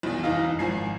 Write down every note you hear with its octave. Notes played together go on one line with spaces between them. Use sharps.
B1 E2
F#1 E3 D#4 D#5 F5
G#1 F3 G#5 C7